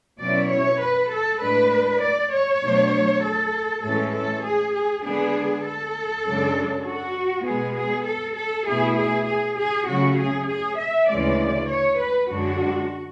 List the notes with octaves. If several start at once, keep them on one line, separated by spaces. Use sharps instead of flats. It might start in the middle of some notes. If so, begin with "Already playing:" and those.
B2 F#3 C#4 E4 D5
C#5
B4
A4
A2 G#3 D4 B4
D5
C#5
B2 F#3 A3 D4
A4
A2 E3 G#3 C#4 A4
A4
G#4
G#4
D3 G#3 B3 D4 G#4
A4
F#2 C#3 G#3 D4
F#4
B2 G#3 B3 G#4
G#4
A4
A4
B2 A3 E4 G#4
G#4
G#4
G#4
C#3 F#3 A3 C#4 F#4
G#4
G#4
E5
D2 C#3 E3 G#3 C#4 D5
C#5
B4
F#2 D3 G#3 D4 F#4